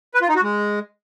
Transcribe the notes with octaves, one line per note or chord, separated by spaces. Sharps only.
B4
F4
D#4
F#4
G#3